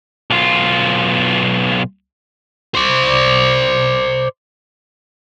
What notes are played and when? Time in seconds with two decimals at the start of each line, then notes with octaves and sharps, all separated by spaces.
0.30 B1 F4
2.75 C5 D5